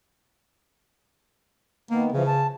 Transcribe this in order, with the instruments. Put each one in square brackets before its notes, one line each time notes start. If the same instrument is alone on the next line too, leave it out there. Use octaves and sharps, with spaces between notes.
[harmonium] D#3 B3 [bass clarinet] A#3
[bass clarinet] C#3 [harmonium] E3 F3
[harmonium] A5